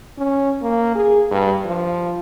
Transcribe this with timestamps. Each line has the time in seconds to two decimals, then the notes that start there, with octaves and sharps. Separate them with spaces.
0.18 C#4
0.63 A#3
0.95 G#4
1.32 G2
1.65 F3